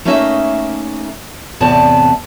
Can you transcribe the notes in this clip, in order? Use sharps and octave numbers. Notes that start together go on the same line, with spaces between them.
A3 A#3 C#4 D#4 E5
E2 A2 C3 B3 D5 A5